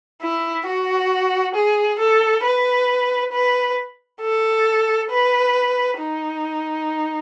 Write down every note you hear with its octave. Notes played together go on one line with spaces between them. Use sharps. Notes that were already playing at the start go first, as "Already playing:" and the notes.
E4
F#4
G#4
A4
B4
B4
A4
B4
D#4